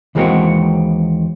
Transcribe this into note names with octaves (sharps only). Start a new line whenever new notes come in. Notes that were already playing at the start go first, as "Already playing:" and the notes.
D#2 E3 G#3 A#3 C4 F#4